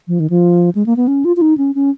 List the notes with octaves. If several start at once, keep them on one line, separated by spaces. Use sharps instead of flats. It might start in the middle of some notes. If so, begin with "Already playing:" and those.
F3
D#3
F3
G#3
A#3
B3
C#4
F4
F4
D#4
C#4
C#4